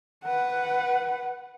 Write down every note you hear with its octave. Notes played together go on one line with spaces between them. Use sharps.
B4 F#5